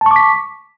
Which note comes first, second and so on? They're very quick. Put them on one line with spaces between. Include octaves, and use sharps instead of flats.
A5 C#6 D6 B6